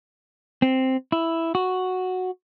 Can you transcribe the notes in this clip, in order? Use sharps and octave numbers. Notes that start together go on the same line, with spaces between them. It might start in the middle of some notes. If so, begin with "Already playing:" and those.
C4
E4
F#4